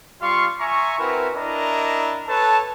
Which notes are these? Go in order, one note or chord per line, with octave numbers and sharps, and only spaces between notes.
G3 F4 D5 F5 C6 C#6
E5 G#5 A#5 C#6
C4 E4 F#4 A#4 B4
D4 E4 A#4 D#5 A#5
A4 B4 C#5 A5